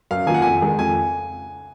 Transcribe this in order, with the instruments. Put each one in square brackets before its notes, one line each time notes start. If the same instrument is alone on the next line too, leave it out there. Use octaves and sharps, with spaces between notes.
[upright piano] F#2 [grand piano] F5
[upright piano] D#3 A#3 F4 [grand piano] G#5
[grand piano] F#5
[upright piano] F2 [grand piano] G#5
[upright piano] D#3 G#3
[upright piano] F2 [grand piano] G#5